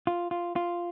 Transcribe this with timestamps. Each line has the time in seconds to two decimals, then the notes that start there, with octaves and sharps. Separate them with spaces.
0.07 F4
0.31 F4
0.56 F4